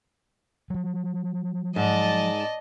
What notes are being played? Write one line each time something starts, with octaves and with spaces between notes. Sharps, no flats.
F3 F#3
G#2 D5 D#5 A5